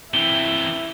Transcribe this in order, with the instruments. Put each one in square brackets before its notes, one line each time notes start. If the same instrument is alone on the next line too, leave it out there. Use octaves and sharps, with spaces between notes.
[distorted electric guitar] C3 E3 [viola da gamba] E4 [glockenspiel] G7